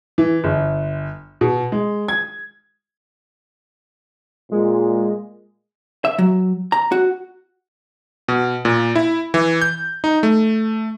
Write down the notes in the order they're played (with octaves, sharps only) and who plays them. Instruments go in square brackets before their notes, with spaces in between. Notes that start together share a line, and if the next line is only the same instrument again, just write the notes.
[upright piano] E3
G1
B2
G#3
G#6
[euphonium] A#2 [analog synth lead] G#3
[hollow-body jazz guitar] E5
F#3
A#5
F#4
[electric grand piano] B2
A#2
E4
E3
G6
D#4
A3